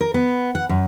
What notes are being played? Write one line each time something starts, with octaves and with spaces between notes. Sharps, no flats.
A#4
B3
F#5
F#2